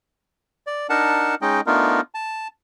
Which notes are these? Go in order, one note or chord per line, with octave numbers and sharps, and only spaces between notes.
D5
D4 D#4 A#4 F#5 A5
G#3 C#4 D#4 D#5 G5
A3 B3 D4 D#4 F4 A#4
A5